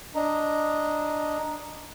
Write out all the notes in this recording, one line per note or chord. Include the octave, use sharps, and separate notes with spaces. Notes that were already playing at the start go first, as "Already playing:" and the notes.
D4 D#5 A#5